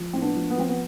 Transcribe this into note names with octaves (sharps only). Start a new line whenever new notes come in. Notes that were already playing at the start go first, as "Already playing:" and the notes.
Already playing: F3
A2 C4
B3 D4
F3
B3
F3 C4
B3